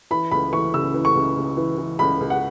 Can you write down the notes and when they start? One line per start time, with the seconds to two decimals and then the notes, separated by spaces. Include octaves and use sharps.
0.11 E3 B5
0.31 C#2 B5
0.53 E3 C#6
0.74 C#3 E6
0.94 E3
1.05 C#6
1.15 C#2
1.36 C#2
1.57 E3
1.78 E3
1.99 C#2 B5
2.21 C#2
2.30 F#5